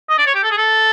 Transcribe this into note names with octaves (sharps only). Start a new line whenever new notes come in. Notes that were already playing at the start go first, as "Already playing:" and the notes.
D#5
D5
C#5
G4
A4
G#4
A4